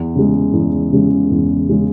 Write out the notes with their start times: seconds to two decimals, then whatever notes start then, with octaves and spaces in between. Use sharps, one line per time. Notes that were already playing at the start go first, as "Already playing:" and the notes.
Already playing: E2
0.16 C#3 G#3
0.53 E2
0.92 C#3 G#3
1.31 E2
1.69 C#3 G#3